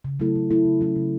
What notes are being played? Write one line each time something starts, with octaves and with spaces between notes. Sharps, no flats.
C#3
F#3 A3 E4 A4
C#3
F#3 A3 E4 A4
C#3
F#3 C#4 E4
C#3